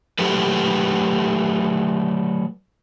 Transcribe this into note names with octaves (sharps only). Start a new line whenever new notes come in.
F#3 A3 G4 A4 B4